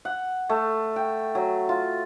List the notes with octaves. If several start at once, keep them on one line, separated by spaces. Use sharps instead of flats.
F#5
A3
G5
F#3
F4